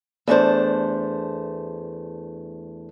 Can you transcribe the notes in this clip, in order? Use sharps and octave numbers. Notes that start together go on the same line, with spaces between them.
E2 A3 D4 C5